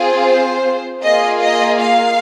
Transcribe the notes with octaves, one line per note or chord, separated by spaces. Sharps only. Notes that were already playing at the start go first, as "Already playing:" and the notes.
Already playing: C4 F4 G#4
C5
A#3 F4 G#4 D#5
D#5
F5